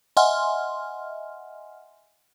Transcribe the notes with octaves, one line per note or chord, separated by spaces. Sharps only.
D#5 E5 F#5 G#5 C6 F6